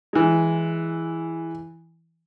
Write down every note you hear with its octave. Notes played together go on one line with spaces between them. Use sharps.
E3 G#3